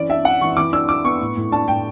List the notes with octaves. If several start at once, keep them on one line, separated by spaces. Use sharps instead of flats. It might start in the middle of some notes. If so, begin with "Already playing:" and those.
Already playing: E3 C#4 D5
D4 E5
D4 F#5
E3 C#6
E3 D6
D4 E6
D4 D6
B3 C#6
A2
A2
D4 A5
A2 G5